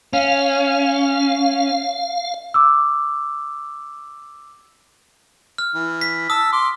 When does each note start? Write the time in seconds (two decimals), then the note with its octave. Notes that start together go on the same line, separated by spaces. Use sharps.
0.13 C#4 F5
2.54 D6 E6
5.58 F6
5.75 E3
6.01 B6
6.30 A5 D#6 E6
6.53 C6 D6